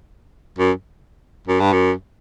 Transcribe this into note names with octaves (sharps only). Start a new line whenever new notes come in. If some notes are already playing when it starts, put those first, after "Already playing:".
F#2
F#2
G2
F#2